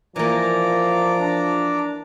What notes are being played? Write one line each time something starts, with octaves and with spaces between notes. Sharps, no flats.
E3 F3 A#3 D5 A#5 D6
D4